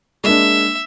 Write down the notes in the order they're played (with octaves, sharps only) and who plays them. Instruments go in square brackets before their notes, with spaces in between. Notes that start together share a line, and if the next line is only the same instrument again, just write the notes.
[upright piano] G#3 A#3 D4 [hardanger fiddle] E5